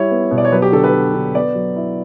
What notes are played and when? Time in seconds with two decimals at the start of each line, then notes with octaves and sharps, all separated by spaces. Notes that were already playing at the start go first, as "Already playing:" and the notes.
Already playing: G3 E4 C#5
0.11 B3
0.31 B2
0.38 D5
0.45 C#5
0.51 F#3 B4
0.62 G4
0.72 D3 A4
0.84 B4
0.94 B3
1.14 D3
1.35 B3 D5
1.55 F#3
1.76 E4